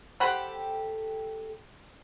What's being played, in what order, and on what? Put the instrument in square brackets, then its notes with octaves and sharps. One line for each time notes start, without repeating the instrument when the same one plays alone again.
[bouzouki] G4 A4 [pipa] C5 F#5 B5